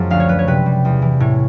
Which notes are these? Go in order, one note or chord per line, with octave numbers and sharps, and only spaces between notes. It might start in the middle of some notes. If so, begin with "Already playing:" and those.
Already playing: F#2 F3 G#3
D2 F5
C#5
F#3 B4
C#5
C3 B4
G3
E2
E3
A2 C#5